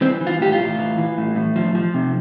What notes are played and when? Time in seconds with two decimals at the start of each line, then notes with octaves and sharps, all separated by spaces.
0.01 E3 C4
0.21 E3
0.27 F4
0.39 A2 G4
0.52 F4
0.59 A2
0.78 E3
0.98 E3
1.18 A2
1.36 A2
1.56 F3
1.75 F3
1.94 C3